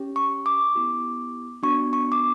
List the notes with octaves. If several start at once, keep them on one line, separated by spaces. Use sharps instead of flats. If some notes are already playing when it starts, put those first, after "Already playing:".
Already playing: C#4 G4
C#6
D6
B3 E4 G4
B3 D4 F#4 C#6
C#6
D6